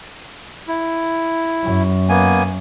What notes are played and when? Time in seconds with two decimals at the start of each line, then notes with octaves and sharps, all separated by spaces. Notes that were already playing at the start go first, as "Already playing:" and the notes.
0.68 E4
1.63 F#2
2.09 A#3 B3 G#5